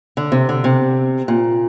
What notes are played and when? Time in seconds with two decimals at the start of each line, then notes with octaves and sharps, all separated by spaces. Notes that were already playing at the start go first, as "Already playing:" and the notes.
0.17 D3
0.32 C3
0.49 D3
0.64 C3
1.28 A#2